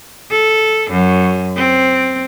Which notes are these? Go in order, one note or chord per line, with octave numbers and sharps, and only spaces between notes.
A4
F#2
C4